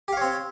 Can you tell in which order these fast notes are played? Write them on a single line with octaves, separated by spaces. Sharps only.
G4 F5 C#5 C4